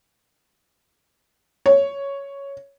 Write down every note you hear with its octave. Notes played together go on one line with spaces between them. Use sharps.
C#5